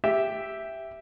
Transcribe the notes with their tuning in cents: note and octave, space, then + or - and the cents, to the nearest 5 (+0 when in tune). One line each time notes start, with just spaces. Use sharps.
G4 +0 E5 +0